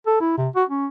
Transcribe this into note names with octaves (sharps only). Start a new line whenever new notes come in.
A4
E4
C3
F#4
C#4